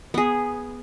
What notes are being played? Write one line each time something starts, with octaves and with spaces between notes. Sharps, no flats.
B3 G#4